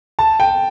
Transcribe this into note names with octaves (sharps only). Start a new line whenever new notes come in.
A5
G5